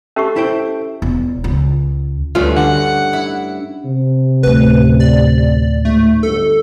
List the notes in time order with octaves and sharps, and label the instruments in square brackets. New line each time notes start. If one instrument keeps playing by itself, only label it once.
[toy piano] C#4 G4 C#6 [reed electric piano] A4 E5
[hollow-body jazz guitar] E4 C5 G5
[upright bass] E1
C#2
[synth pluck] D2 F4 [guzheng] G2 A3 C#4
[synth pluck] D3 [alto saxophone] F#5
[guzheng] E4
[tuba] C3
[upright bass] D2 A2 [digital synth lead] B4
[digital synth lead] D5
[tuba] G#2 [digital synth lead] A3
[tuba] G1 [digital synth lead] A4